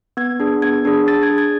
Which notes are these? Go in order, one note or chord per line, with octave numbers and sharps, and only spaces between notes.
B3 G#6
D4 G#4
B3 G#6
D4 G#4
D4 A6
G#6
G#4
G#6